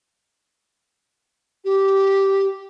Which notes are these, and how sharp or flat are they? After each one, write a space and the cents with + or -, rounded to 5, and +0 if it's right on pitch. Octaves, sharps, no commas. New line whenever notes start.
G4 -10